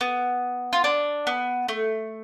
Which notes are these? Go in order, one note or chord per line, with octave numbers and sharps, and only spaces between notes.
B3
F4
D4
B3
A3